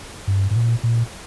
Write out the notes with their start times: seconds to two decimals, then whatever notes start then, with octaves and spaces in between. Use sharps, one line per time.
0.27 G2
0.51 G#2
0.56 A#2
0.83 A#2